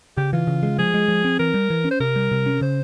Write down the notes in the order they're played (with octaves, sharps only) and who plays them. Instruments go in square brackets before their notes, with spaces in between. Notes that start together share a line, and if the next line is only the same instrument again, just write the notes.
[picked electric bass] C#3 [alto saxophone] G4
[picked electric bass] E3 [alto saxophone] F4
[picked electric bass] C#3
G#3
[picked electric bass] F3 [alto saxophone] G#4
[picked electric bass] G#3
F3
C4
[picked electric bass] E3 [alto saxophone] A#4
[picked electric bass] G3
E3
C#4
[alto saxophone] C5
[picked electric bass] C3 [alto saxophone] A#4
[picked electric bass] G3
C3
C#4
[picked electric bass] C#3 [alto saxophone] C5